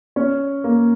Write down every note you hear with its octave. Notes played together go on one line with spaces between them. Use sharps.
C#4
A#3